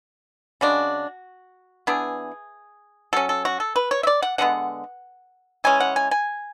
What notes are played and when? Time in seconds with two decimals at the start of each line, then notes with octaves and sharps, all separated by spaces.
0.61 C#3 G#3 D4 F#4
1.87 E3 B3 D4 G#4
3.13 F#3 C#4 A4
3.29 A4
3.45 F#4
3.60 A4
3.76 B4
3.91 C#5
4.03 E5
4.07 D5
4.22 F#5
4.38 D3 G#3 B3 F#5
5.64 E3 G#3 C#4 G#5
5.80 F#5
5.96 G#5
6.11 G#5